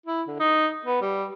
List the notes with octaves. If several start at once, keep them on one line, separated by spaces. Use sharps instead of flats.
E4
D3
D#4
B3
G3